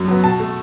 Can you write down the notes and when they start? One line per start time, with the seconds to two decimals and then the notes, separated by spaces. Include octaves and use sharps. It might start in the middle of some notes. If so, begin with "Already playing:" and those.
Already playing: F#2
0.08 F#3 B3
0.24 B2 A5
0.40 A3